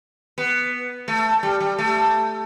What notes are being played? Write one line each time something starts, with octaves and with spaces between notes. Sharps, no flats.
B3
A3
G3
G3
A3